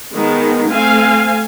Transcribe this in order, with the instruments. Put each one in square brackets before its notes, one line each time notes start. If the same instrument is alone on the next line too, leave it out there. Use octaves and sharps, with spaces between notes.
[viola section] D#3 G#3 B3
A3 C4 F5 G#5